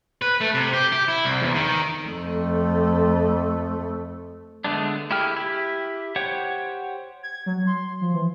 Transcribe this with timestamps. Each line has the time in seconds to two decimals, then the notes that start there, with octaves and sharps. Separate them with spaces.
0.22 B4
0.41 A3
0.54 C3
0.73 G4
0.92 G4
1.08 E4
1.25 C2
1.42 E2
1.55 D#3
2.05 F2 A3
4.64 D3 G#3 A3 B3 D4
5.11 E4 G4 G#4 G5 F6
5.36 E4 G4
6.16 G4 C5 C#5 F#5
7.23 G#6
7.46 F#3
7.67 C6
8.01 F3
8.14 E3